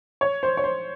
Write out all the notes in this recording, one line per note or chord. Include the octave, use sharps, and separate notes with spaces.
C#5
C5
C#5
C5